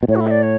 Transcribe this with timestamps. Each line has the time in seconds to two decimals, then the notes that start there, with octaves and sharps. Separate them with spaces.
0.03 B2
0.08 A2 C#5
0.15 F#4
0.20 E4
0.27 E5
0.30 D5
0.42 C#5